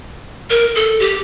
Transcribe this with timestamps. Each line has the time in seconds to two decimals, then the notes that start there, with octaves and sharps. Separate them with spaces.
0.50 A#4
0.75 A4
1.00 G4